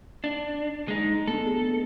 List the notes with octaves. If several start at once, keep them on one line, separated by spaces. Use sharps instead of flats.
D4
G#3 D#4
A3 B3 D4 A4
B3 G#4